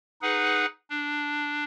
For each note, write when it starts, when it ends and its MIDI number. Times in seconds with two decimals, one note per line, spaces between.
0.22 0.66 63
0.22 0.66 68
0.22 0.66 71
0.22 0.66 78
0.90 1.64 62